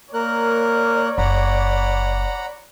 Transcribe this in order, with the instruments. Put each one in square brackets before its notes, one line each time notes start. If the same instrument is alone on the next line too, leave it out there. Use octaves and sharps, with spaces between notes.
[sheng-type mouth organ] A#3 A#4 F#6 [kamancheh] C#5 D5
[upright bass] F#1 [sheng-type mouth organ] F#5 A#5 B5